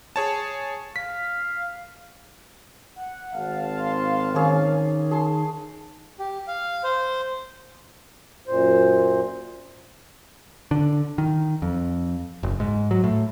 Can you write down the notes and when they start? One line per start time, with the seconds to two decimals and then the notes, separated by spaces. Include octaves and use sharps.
0.16 G#4 C#5 A5
0.96 F5 B6
2.96 F#5
3.33 G#1 F5 A5
3.76 C6
4.35 D#3 A#3 C#4 G#4
5.11 G#4 A5 C6
6.19 G4
6.48 F5
6.84 C5
8.48 F#2 A#2 C5
10.71 D3
11.18 D#3
11.62 F2
12.43 F#1
12.60 G#2
12.91 F#3
13.04 A2